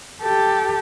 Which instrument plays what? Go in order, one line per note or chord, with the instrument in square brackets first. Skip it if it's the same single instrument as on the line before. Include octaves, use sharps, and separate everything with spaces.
[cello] G4 A4